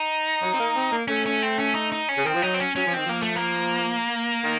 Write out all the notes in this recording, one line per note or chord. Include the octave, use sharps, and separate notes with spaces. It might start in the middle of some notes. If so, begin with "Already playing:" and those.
Already playing: D#4
F#3
C4
A#3
C4
A#3
A3 C#4
C#4
C4
C#4
D#4
D#4
C#4
C#3
D#3 C4
F3
F#3 D#4
C4
C#4
F#3 C#4
F3
D#3 C4
F3 A#3
A3
A#3
D#3